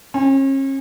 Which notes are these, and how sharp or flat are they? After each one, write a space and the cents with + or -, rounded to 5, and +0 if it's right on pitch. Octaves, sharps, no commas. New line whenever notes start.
C#4 -40